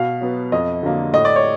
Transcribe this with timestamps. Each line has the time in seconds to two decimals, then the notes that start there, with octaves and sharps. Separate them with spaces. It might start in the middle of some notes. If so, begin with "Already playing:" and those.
Already playing: B2 F5
0.21 F#3 B3
0.52 F2 D#5
0.83 D3 F#3 A#3
1.13 A2 D#5
1.25 D5
1.36 C#5